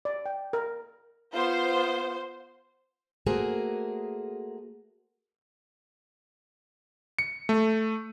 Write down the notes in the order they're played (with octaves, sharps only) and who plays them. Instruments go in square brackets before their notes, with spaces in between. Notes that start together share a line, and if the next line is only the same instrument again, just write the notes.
[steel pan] D5
G5
A#4
[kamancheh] B3 F4 [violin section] C5
[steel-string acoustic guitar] A3 A#3 F#4 G#4 A#4 C5
[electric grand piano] C#7
A3